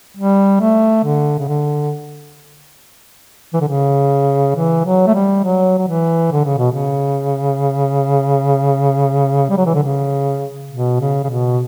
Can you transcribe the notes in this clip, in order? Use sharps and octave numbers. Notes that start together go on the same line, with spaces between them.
G3
A3
D3
C#3
D3
E3
D3
C#3
E3
F#3
A3
G3
F#3
F#3
E3
D3
C#3
B2
C#3
G3
F#3
E3
D3
C#3
B2
C#3
C#3
B2